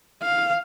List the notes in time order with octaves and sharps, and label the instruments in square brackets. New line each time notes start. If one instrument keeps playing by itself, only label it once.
[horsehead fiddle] F5